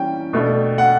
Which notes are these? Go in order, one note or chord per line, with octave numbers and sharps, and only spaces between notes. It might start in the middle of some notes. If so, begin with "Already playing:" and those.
Already playing: E3 G3 C#4 G5
B2 A3 D4
F#5